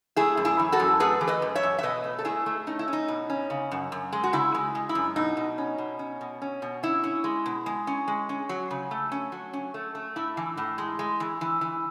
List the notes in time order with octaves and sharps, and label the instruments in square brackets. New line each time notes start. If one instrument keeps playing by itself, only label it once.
[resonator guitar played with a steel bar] A3 E4 G#4
F#2
E4 G#4
E3
F#4 A4
F#2
A3 G#4 B4
E3
B4 D#5
F#2
C#5 E5
F#2
E5
B2 B4 D#5
A3
A4
A3 E4 G#4
A3
C#4 D#4
E4
C#4
D#4
B2
C#4
C#3
F#2
F#2
G#3
F#4
C#3 E4
G#3
G#3
E4
F#2
B2 D#4
B2
C#4
B2
C#4
B2
C#4
B2
C#4 E4
C#4
G#3
B2
G#3
C#4
G#3
C#4
F#3
C#3
A3
C#4
F#3
C#4
A3
A3
A2 E4
E3
A2
G#3
G#3
E3
E3
E3